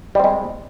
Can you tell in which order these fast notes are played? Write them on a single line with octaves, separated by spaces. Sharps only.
G3 C4 G#3